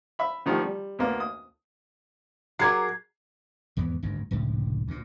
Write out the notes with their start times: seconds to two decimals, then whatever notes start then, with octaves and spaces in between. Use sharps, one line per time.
0.19 E5 B5
0.46 D3 D#3 F3 A3 G4
0.63 G3
0.99 D2 A#3 B3
1.20 D#6
2.59 F#3 G#4 A#4 D6 G#6 C7
3.77 G#1 E2 E3 B3
4.03 G#1 D2 G2
4.31 F1 C#2 A2 D3
4.88 D2 A#2